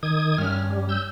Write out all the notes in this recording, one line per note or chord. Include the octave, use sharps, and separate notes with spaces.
D#3 D#6 G#6
G2 C#4 F6
G3
E6 G6